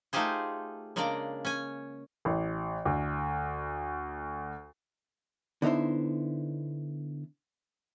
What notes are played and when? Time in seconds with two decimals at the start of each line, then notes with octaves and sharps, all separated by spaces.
0.13 A3 D#4 F4 G4 G#4 C5
0.96 C#3 G#3 A#3 D4 D5 A#5
1.45 C#4 G#5
2.25 A1
2.85 D2
5.62 D3 B3 D#4 E4 C5